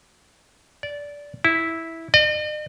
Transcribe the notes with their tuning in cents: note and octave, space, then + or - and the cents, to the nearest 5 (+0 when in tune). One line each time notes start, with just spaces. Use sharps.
D5 -15
E4 -10
D#5 -45